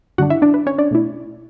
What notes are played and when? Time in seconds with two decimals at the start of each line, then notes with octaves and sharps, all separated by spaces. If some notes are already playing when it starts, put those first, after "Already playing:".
0.18 G2 D3 G3 D4 F#4 F#5
0.30 E4 E5
0.42 D4 D5
0.54 B4
0.66 C#4 C#5
0.78 D4 D5
0.91 B2 A3 E4